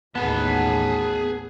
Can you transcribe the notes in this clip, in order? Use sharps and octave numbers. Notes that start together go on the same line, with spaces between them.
A1 D#2 B3 G#4 A5